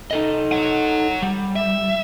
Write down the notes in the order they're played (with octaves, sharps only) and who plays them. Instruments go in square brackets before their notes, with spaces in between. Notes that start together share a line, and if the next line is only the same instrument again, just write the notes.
[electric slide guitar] D#4 A4 D#5
[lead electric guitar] C#5 F#5
[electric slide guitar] G3
[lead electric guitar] E5